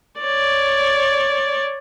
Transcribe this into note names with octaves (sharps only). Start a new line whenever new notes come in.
C#5 D5